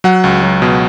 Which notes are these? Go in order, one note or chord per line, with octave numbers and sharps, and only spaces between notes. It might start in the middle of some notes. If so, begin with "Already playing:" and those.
F#3 F#5
C#2
F#3
B2